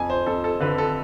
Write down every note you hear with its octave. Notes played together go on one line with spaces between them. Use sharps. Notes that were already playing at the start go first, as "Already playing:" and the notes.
Already playing: F2 G#5
C5
F2 A4
A4
D3 B4
A4